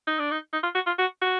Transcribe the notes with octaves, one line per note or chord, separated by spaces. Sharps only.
D#4
D4
D#4
D#4
F4
F#4
F4
F#4
F#4